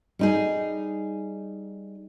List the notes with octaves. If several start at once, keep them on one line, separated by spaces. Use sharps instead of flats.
G3 D#4 G#4